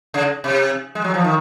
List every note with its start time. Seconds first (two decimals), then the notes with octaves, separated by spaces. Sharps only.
0.14 C#3
0.44 C3
0.95 G#3
1.04 F#3
1.14 F3
1.24 D#3